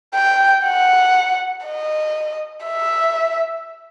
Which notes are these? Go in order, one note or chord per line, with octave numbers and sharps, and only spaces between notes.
G5
F#5
D#5
E5